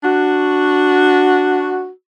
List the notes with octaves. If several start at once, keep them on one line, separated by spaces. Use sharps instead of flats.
D4 F#4